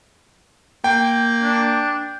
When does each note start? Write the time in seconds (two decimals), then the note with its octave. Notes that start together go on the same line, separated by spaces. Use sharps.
0.84 A#3 G5
1.43 D4